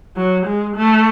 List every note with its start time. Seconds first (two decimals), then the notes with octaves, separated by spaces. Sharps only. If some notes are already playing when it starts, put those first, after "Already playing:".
0.16 F#3
0.46 G#3
0.76 A3